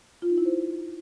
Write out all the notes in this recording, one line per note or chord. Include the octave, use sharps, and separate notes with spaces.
F4
D#4
E4
C5